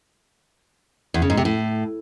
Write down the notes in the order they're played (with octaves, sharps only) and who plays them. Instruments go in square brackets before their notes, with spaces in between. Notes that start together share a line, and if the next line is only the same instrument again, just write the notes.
[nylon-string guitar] E2
C#3
G#2
C3
A2